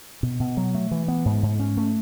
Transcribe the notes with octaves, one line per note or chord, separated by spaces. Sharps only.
B2
B2
F#3
A3
E3
B3
G#2
G#2
C#4
A3